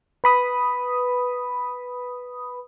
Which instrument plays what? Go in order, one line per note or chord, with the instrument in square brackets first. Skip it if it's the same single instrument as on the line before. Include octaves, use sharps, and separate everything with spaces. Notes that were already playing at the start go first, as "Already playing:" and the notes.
[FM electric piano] B4 B5 D#6